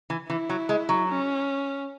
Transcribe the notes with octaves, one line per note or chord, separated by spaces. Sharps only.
E3
E3 E4
F#3
G#3
F#3
C#4